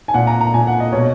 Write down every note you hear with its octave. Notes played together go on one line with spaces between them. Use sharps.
G#5
A#2 F#5
A#5
A#5
A#2 G#5
F#5
D#5
B2 C#5